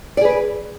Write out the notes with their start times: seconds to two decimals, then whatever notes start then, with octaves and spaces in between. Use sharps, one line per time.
0.17 D5
0.21 G#4
0.25 B4